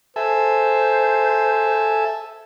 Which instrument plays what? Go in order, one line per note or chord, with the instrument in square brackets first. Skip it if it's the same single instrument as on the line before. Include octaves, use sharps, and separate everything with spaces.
[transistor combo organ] A4 E5 G#5 [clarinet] C5